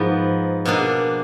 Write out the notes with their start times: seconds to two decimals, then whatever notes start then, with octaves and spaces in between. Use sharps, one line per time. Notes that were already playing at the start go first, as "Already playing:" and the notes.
Already playing: G#2 F3 B3
0.65 B2 A#3 D4 G#4